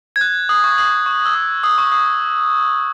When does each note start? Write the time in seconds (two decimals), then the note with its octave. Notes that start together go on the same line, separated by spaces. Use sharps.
0.16 G#6
0.21 F#6
0.49 D#6
0.64 C#6
0.78 D#6
1.06 C#6
1.26 E6
1.35 D#6
1.64 D#6
1.78 C#6
1.92 D#6